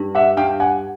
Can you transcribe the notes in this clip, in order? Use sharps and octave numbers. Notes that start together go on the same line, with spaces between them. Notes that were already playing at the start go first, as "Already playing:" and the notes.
Already playing: G2
E5 F#5
G2 F5 G5
F#5 G#5